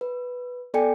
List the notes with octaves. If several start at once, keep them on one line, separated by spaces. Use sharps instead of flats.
B4
B3 A4 D5 G5 G#5 C#7